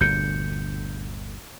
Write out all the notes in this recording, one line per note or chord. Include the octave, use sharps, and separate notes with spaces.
G1 D2 A#2 G6 C#7